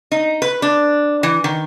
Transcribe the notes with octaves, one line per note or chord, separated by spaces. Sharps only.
D#4
B4
D4
E3
D#3